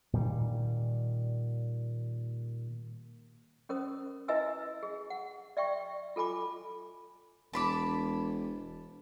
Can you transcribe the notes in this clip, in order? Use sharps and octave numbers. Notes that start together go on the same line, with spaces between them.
A#2 D#3 G3
C#4 A#4 C5 D#6
E4 B4 D#5 E5 G#5 E6
G#4
F#5
D5 E5 G5 C#6
F4 A4 G#5 B5 D6
E1 A5 B5 D6